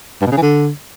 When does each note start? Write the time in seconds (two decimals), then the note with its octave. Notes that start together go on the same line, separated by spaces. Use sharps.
0.21 G2
0.26 B2
0.32 C#3
0.37 E3
0.42 D3